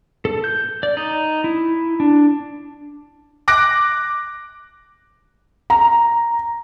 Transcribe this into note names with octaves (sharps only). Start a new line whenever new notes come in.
A4
G6
D5
D#4
E4
D4
D6 F#6 A#6 D7
A#5